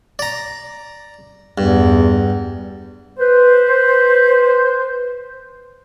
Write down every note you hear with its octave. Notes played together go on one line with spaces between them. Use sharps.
D5 A#5
E2 G2
B4 C5